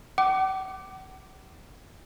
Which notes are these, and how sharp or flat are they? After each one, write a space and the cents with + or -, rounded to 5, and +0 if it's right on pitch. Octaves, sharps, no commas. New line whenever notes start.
F#5 +45 D6 +0